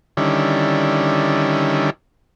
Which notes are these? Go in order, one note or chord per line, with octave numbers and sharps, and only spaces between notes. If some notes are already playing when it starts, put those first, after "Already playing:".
D3 D#3 G3 C#4 E4